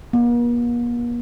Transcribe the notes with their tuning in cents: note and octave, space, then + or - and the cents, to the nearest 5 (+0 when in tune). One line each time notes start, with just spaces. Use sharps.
A#3 +45